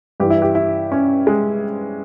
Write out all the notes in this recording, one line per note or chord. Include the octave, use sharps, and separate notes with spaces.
G2 E3 G4
E4
G4
E4
C#4
G#3